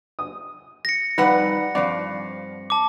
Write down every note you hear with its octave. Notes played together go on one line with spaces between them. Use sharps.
D#6
A#6 C#7
F2 G3 D#4 B4 D5 F#5 F#6
G2 F3 C4 C5 D5 C7
A5 D6